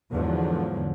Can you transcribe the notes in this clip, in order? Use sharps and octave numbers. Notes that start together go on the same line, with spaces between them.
E2 G#2 D3 F3 F#3